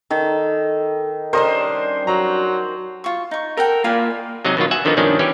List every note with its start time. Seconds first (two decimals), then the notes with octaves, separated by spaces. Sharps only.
0.11 D#3 A4
1.33 G3 C#4 D4 A#4 C5 D#5
2.07 F#3 A#5
3.04 F4 C#6
3.31 D#4 C#6
3.57 A4 A#4 F#5 G5
3.84 A#3 F4 F5 G#5 B5
4.45 C3 F#3 G#3 D#4 G#4 D#5
4.57 B2 D#3 F#3 F4
4.71 E5 F#5 G#5
4.85 D3 D#3 F3 B3 D#4
4.97 G2 B2 D#3 F3 C#4 D4
5.19 E3 C#4 G4